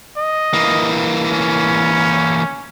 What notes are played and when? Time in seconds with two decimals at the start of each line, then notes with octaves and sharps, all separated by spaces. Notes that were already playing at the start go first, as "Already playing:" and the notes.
0.17 D#5
0.53 E3 A#3
1.31 C#4